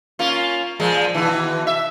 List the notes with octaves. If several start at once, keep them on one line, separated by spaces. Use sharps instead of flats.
A#3 C#4 F4
A#2 F3 G#3
D#2 B2 E3
E5